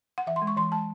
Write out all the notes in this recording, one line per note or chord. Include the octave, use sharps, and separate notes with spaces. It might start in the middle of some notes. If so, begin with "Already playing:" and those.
F#5
E3 E5
C6
G#3
C#6
E3 C6
G#3 A5